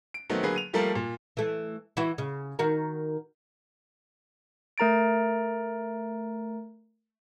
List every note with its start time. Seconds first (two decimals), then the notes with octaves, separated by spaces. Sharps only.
0.14 D7
0.29 D#3 F#3 A3 B3 C4
0.43 D3 F#3 A#3 G#4 B4
0.56 D#7 F7
0.73 F3 G3 A3 A#3 A4 A#4
0.95 A#2
1.37 E3 A3
1.97 E3 E4 F#4
2.18 C#3
2.59 D#3 F#4 A#4
4.78 A3 A#4 A#5 A6 D7